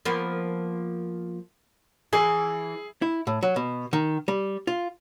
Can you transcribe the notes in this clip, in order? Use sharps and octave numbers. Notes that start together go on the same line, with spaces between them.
F3 A#3 B3
E3 G#4
E4
A2
F#3
B2
D#3
G3
F4